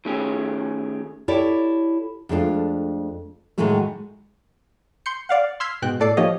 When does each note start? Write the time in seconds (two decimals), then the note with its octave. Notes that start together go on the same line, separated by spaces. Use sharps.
0.05 D#3 A3 C#4 G4 G#4
1.28 E4 G4 A4 C#5 D5
2.29 F2 G#3 A3 B3 D4 F4
3.58 A2 D#3 E3 F#3 G#3 A3
5.06 C6 G6 C#7
5.29 D5 F5 F#5
5.60 C6 E6 F6 G#6 B6 C7
5.82 G#2 B2 G5 F#6
6.00 A2 A3 A4 D5 D6 C7
6.17 F3 A#3 D#4 G4 C#5 D#5